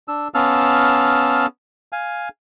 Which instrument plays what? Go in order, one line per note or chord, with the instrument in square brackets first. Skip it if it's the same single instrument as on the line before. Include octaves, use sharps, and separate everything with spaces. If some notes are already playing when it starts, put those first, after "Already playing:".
[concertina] D4 E6
B3 C#4 F5 A5 E6 F6
F5 G#5